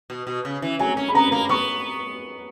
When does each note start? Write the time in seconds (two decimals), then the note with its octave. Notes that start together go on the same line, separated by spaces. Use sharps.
0.10 B2
0.27 B2
0.45 C#3
0.62 E3
0.79 F#3 G#5
0.97 C#4
1.08 B5
1.15 B3 A#5
1.32 A#3
1.49 B3 C#6